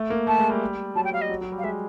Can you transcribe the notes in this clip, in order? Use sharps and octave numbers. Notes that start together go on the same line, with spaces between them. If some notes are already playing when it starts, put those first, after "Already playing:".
Already playing: A3
A#3
A3 A5
G#3
G3
F#3 A5
G5
G3 F5
D#5
F#3
F#3
G3
F5
G#3 E5